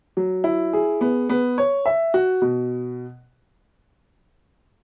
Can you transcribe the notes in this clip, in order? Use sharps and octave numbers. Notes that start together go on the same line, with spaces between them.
F#3
E4
G#4
B3
B3
C#5
E5
F#4
B2